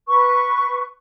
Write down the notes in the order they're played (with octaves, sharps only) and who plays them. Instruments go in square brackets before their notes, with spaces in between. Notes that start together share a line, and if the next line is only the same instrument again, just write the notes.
[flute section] B4 C#6